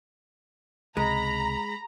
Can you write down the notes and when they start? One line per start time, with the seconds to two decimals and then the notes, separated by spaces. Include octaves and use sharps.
0.97 C#2 C3 G#3 A#5 B5